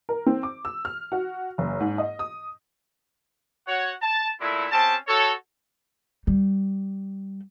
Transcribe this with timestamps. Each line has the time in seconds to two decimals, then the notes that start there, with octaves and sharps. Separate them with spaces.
0.09 A#4
0.26 C4
0.43 D6
0.65 E6
0.85 F6
1.12 F#4
1.58 F#1
1.80 G#2
1.98 D#5
2.19 D#6
3.67 F#4 C#5 F#5
4.02 A5
4.41 A#2 D3 A3 E4
4.72 C4 C#4 G4 A5
5.08 F#4 A4 C#5
6.27 G3